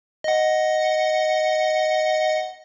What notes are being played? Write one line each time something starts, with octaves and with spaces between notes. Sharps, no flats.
D#5 F#5